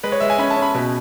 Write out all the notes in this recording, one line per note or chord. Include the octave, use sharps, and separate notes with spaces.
G#3 B4
C#5
G#3 E5
G#5
C#4 B5
A5
C#4
B5
B2